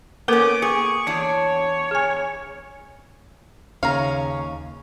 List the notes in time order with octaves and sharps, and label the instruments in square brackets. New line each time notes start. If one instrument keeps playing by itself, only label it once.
[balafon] A#3 A4 A#4 [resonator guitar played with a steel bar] B3 C#4 [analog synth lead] D6
[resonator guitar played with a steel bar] G#4 [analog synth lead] C#6
[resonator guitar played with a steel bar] E2 D4 [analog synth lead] C#5
[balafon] G#4 G#5
[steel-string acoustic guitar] D#2 C#4 C#5 [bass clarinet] C#3 [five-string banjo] F5 A#5